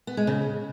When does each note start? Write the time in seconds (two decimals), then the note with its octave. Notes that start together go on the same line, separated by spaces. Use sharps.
0.07 B3
0.17 G#3
0.27 C#3